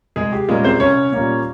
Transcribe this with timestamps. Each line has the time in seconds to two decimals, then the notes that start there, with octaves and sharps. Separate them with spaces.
0.16 C2 G#3 G#4
0.33 G4
0.48 A#2 G3 G#3 A#3 C#4 G#4
0.65 C4 C5
0.80 C2 C#4 C#5
1.13 A#2 G3 A#3 C#4